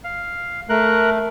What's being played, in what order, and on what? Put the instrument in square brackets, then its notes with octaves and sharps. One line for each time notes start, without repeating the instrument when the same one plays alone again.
[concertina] F5
[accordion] A3 [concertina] A#4 F#6